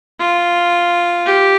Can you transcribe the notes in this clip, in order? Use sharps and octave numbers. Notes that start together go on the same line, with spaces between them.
F4
G4